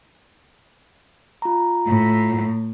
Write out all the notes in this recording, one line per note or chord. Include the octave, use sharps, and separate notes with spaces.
F4 A#5
A2